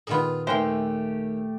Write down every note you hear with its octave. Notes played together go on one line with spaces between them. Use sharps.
A#2 D#3 B3 F4 G#4
D#2 A3 G4 C5 E5 G5 G#5